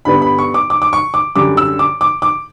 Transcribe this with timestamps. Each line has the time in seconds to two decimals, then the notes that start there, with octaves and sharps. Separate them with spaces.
0.05 G2 D3 G3 B3 D4 B5
0.22 B5
0.38 C#6
0.54 D6
0.70 D6
0.82 D6
0.93 C#6
1.14 D6
1.36 F#2 D3 G3 D6
1.57 E6
1.79 D6
2.01 D6
2.22 D6